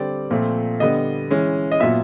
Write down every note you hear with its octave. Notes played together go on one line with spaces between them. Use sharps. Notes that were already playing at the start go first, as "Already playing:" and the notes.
Already playing: D3 G3 C4 D5
A#2 F3 A3 C4
D3 G3 B3 D#5
E3 G#3 C#4
D#5
A#2 F#3 B3 E5